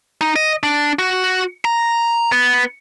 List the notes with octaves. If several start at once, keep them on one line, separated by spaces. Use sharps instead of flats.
D#4
D#5
D4
F#4
A#5
B3